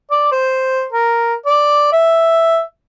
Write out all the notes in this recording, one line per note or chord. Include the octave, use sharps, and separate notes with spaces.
D5
C5
A#4
D5
E5